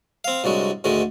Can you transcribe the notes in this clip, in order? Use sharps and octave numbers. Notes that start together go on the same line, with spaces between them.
C4 F5
C2 G2 F#3 G#3
D2 G#2 D#3 G#3